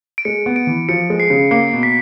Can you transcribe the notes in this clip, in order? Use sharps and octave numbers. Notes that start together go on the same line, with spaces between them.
D7
G#3 C#7
B3
D7
E3
F3 C#7
G#3
C7
C#3
A#3 C7
B2
B6